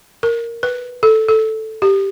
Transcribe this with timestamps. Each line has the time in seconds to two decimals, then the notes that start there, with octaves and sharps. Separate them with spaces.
0.23 A#4
0.63 B4
1.03 A4
1.29 A4
1.82 G4